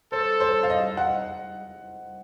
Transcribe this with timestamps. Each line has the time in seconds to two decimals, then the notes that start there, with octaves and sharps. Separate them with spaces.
0.12 A4 C5
0.40 C5
0.63 F5
0.70 D#5
0.97 F#5